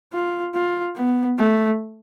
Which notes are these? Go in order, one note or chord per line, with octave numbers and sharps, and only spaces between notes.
F4
F4
B3
A3